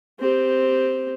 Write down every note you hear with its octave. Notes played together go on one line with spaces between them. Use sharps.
C4 G4